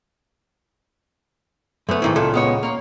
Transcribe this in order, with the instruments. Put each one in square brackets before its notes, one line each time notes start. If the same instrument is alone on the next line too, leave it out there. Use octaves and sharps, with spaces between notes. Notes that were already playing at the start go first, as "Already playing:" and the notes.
[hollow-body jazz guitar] F#2 B3 [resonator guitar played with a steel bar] A3
[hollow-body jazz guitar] G#2 D#3 E3
[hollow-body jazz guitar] C#2 A#2 [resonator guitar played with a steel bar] A4
[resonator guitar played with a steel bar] G#3 B3 C#5
A#3 C#5